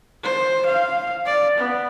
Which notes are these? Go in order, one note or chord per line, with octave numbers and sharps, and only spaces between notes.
C5
F5
D5
B3